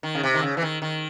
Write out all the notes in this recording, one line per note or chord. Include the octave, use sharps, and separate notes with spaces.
D#3
C#3
C3
D#3
C#3
E3
D#3
D#3